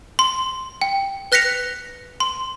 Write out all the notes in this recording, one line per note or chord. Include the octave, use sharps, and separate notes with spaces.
C6
G5
B4 F#6 A#6 B6 C#7 F7
C6